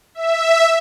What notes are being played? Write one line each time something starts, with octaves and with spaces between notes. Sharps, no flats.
E5